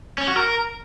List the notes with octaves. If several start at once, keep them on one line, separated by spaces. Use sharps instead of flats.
C#4
F#4
A#4